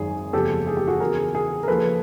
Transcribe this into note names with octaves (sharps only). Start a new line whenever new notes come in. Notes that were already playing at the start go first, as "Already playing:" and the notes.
Already playing: G#1 F#2 D#3 G#4
F#1 E2 C#3 F3 G4 A4
G#4
G4
F#4 G#4
E2 C#3 E3 G#4 A#4
G#4 A#4
A#4
D#2 C#3 F3 A4 B4